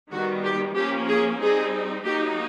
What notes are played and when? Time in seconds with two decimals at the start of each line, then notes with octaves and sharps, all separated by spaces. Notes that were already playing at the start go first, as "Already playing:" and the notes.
0.12 D#3 G3 B3 F#4
0.44 G4
0.76 F3 A#3 C#4 G4
1.08 G#4
1.40 G3 C4 D#4 G#4
2.04 F#3 A#3 D#4 G4